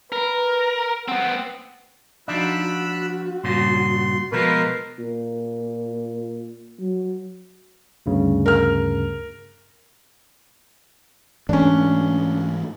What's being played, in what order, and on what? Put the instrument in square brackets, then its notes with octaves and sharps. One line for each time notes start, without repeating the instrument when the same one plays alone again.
[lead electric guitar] A#4 [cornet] B4
[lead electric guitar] B3 C4 [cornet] F#5
[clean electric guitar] F3 D4 [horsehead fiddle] D#4 F#4 [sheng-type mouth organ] B5 E6 F#6
[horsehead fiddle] F#4
[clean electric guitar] G2 A#2 C#3 [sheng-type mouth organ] C6
[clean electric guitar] B2 F3 G#3 [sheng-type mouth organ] A#4 B4
[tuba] A#2
F#3
[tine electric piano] D2 G2 C#3
[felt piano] A#4 F6
[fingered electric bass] G#2 E3 A3 [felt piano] C#4 D4